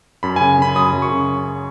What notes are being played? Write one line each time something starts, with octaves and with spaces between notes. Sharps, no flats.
F#2 B5
C#3 G#5
C#3 B5
F#2 D#6
F#2
C#6
C#3